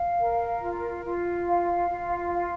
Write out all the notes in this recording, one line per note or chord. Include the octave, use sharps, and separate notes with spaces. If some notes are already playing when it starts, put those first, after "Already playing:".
Already playing: F5
A#4
F4
F4
F5
F4
F5